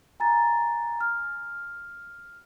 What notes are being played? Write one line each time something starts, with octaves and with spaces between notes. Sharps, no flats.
G#5 A#5 A6
F6